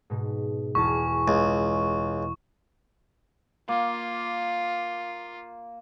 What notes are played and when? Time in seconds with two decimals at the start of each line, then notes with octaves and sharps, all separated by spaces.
0.10 G#2 B2
0.75 E1 E2 A5 C#6
1.28 C#2
3.68 A#3 F4